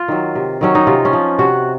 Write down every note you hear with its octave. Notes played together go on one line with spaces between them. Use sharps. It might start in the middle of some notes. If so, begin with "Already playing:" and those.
Already playing: F4
D#3 F#3
C3
D#3 F#3 C#4
D#4
C3 F4
C#4
F3
C3 F#4